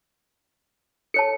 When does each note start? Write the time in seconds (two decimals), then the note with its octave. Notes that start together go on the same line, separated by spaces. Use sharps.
1.14 A4 C#5 A5 C#7